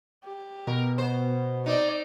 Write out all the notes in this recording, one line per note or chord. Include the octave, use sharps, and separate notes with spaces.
G4
B2 A#4
B3 C5
C4 D#4 D5